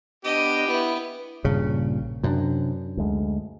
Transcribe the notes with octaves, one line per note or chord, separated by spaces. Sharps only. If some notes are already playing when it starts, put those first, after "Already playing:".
B3 D4 G4 D#5
B3 E4
A#1 G2 A#2 C#3
F#2 C3 C4 D4
D2 G#3